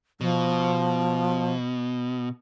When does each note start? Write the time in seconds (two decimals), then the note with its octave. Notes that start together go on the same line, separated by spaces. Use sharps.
0.21 B2 F3